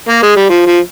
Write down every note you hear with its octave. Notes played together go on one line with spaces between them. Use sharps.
A#3
G#3
G3
F3
F3